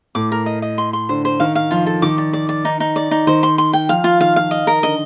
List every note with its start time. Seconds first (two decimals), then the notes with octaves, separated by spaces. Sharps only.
0.15 A2 D6
0.32 A#4
0.46 D#5
0.62 D#5
0.78 C6
0.93 C6
1.09 D3 C5
1.25 C5
1.40 D#3 F5
1.55 F5
1.71 F3 F4
1.87 A4
2.02 D#3 D6
2.18 D5
2.33 D5
2.49 D5
2.65 D#4
2.80 D#4
2.96 D5
3.11 D#4
3.27 D#3 C5
3.43 C6
3.58 C6
3.73 G5
3.89 F3 F5
4.04 F4
4.20 D#3 F5
4.36 F5
4.51 D#5
4.67 A#4
4.83 D3 D#5